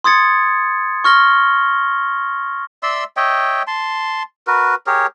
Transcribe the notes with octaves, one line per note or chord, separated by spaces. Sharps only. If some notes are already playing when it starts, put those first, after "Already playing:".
C6 D#6 G#6 A6 C#7
C#6 F6 A#6 G7
D5 E5 C6 E6
C#5 D#5 E5 G5
A5 C6
F#4 A#4 B4
G4 G#4 A#4 C#5